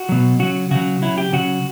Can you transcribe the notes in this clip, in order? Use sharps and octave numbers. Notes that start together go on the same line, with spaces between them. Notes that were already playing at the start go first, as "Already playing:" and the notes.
Already playing: F#4
B2 F#3
C#3 F#3 F#4
C#3 F#3 F#4
C#3 F#3 E4
G4
C#3 F#3 F#4